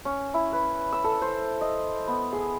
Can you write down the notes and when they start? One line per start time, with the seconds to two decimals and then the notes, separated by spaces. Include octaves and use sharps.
0.05 C#4
0.34 E4
0.53 B4
0.93 E6
1.04 A4
1.22 C5
1.61 D#5
2.07 B3
2.33 G#4